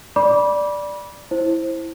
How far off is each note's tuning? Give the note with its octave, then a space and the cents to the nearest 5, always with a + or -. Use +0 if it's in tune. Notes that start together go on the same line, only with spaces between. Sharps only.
D5 +0 B5 -25 D6 -20
E4 +0 C5 +15